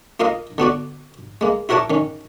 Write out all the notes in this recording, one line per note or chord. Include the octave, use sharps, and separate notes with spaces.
A#3 F4 A#4 D#5 F5
D3 B3 F#4 D5
G#3 A#3
E4 F#4 A#4 C#5 A5 D6
D#3 C#4